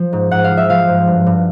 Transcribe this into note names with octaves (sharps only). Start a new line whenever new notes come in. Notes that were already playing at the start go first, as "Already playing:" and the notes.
Already playing: F3
G#2
G#2 F#5
F5
F3
E5
F3 F5
G#2
G2
G2